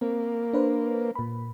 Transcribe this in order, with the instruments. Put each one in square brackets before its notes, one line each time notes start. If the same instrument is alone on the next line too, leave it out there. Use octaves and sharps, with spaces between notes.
[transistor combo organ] A#3 [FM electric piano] C4
[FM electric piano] D4 B4 C5
A#2 B5